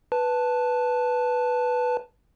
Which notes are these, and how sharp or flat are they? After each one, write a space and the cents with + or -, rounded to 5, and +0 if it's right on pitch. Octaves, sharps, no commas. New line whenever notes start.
B4 +0 A5 +0